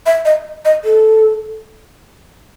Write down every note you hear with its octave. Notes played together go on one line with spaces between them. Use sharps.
E5
D#5
D#5
A4